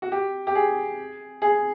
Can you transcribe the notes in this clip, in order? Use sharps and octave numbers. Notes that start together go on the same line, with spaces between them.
F#4
G4
G4
G#4
G#4